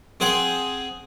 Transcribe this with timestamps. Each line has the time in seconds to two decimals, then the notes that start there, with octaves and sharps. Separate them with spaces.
0.20 C4 G#4 C5 F#5 G#5